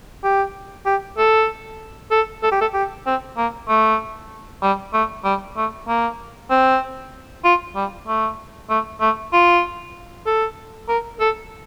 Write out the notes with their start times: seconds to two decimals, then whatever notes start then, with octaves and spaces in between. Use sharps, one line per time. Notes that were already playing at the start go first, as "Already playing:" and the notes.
0.24 G4
0.86 G4
1.18 A4
2.11 A4
2.43 A4
2.52 G4
2.61 A4
2.74 G4
3.06 C4
3.37 A#3
3.68 A3
4.62 G3
4.93 A3
5.24 G3
5.56 A3
5.88 A#3
6.50 C4
7.44 F4
7.75 G3
8.08 A3
8.69 A3
9.00 A3
9.33 F4
10.26 A4
10.88 A#4
11.20 A4